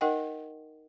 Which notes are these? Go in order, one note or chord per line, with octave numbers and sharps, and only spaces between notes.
D#4 A#4 D#5 F#5 G5